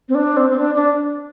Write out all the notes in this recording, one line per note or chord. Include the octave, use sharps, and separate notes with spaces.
C4
D4
C4
C4
D4
D4